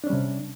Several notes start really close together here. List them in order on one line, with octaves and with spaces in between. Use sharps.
D4 C#4 G3 C3